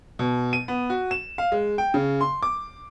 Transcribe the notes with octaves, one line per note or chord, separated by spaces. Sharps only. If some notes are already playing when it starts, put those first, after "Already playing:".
B2
D#7
B3
F#4
E7
F5
G#3
G5
C#3
C6
D6